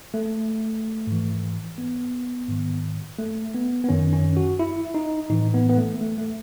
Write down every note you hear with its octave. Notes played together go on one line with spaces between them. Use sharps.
A3
G#2 E3
B3
G#2 D#3
A3
B3
B3
F#2 D#3 C#4
C#4
F#4
E4
D#4
A2 E3 D#4
B3
B3
A3
A3
A3